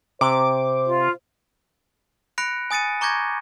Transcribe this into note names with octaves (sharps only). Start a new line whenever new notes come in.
C3 C5 D6
F4
B5 F#6 A#6 C#7 D7
G#5 D#6 A6 C#7 D#7
A#5 C#6 D6 G6 G#6 A#6